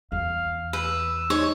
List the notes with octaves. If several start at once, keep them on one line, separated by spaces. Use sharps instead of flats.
E2 F5
B4 E6
D#4 C#5